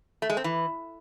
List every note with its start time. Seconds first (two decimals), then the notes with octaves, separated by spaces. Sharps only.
0.22 A3
0.30 G#3
0.37 C4
0.44 E3